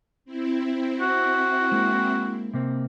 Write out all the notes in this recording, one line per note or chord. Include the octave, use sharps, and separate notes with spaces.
C4 E4
F#4
G#3 A#3
C3 A#3 C4